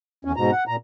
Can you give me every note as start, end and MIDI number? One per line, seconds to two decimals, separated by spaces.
0.25 0.32 40
0.25 0.32 61
0.36 0.51 44
0.36 0.51 47
0.36 0.51 82
0.51 0.64 78
0.67 0.76 46
0.67 0.76 82